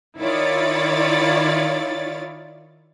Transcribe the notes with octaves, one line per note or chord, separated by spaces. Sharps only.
D#3 E4 F4 C#5 D5 A6